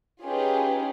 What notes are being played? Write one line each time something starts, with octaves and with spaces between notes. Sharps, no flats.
C#4 D#4 F4 G4 G#4 B4